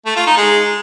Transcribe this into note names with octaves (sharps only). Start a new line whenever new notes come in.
A3
F4
D#4
G#3